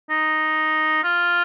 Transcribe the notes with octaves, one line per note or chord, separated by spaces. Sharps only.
D#4
F4